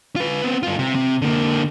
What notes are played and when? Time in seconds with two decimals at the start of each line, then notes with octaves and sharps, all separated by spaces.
0.16 F4 B4
0.43 B3 C4
0.63 G2 F4
0.79 C3
0.95 C3
1.22 D3 A#3